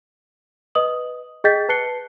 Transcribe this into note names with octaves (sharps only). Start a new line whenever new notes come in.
B4 D#5 D#6 F#7
G#4 D#5 G5 G6 A6 B6
B4 A5 F#6 C7 C#7 G7